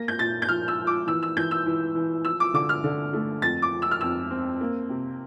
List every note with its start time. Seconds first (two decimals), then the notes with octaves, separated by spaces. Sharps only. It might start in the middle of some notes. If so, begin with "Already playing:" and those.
Already playing: A#3 A#6
0.08 G6
0.19 A#2 A6
0.42 G6
0.49 F3 F6
0.68 E6
0.79 F3
0.87 D6
1.07 E3 E6
1.23 E6
1.37 E3 G6
1.51 E6
1.66 E3
1.95 E3
2.25 F3 E6
2.40 D6
2.54 D3 D6
2.69 F6
2.84 D3
3.13 A3
3.42 F2 A6
3.62 D6
3.71 F3
3.82 E6
3.91 F6
4.01 F2 E6
4.31 C4
4.61 A#3
4.89 C3